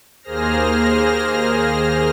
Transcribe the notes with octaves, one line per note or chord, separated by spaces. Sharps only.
D#2 A#3 G#4 C5 F6 A#6